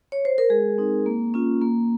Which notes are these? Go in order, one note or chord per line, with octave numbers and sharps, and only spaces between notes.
C#5
C5
A#4
G#3 G#4
C4 D#4
A#3
C#4 F4
A#3